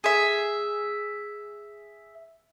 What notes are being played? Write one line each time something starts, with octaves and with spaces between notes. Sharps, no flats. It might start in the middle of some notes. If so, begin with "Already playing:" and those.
G#4 E5